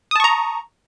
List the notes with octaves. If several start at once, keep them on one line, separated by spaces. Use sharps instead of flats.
A5 A#5 C#6 D#6